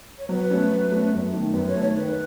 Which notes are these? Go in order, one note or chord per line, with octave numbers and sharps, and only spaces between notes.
C#5
F#3 B4
A3 C#4
F#3
A3 C#4
F#2
D#3 A3
F#2 B4
C#5
D#3 A3
C#5
D#3 B4